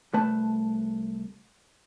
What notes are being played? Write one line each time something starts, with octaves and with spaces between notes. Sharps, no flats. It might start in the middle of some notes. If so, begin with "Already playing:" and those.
C2 A3 B4 A5